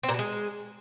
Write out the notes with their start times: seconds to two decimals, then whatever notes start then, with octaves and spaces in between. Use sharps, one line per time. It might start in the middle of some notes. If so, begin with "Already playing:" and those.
0.03 C4
0.09 A#2
0.14 B2
0.19 G#3